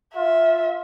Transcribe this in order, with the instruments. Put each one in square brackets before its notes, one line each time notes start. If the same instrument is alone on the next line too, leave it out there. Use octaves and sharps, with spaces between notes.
[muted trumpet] F4 [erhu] E5